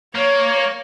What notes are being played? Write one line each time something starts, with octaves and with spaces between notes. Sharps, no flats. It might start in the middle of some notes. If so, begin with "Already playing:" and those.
A#3 C#5